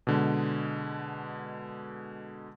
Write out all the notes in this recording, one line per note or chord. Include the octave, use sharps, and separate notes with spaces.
B2 D3 G#3